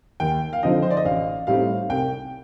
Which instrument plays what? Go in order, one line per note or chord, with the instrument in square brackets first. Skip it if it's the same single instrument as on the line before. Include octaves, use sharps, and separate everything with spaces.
[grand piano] D#2 G5
F5
D3 F3 C4 D#4 D#5
C5
D5
D#5
A1 F5
A2 G3 C4 D#4 F5
C2 G5